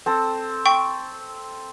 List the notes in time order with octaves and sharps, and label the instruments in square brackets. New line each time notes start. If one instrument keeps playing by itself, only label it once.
[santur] C4 A4
[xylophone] G5 C#6